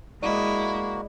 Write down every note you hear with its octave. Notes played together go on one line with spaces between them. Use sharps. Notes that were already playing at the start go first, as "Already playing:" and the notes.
G#3 A#3 E4 F#4 D5 D#5